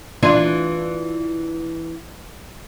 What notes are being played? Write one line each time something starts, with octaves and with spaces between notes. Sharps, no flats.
E3 D4 F4